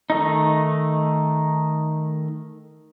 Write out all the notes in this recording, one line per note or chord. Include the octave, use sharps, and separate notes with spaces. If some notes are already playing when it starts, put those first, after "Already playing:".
D#3 A3 D#4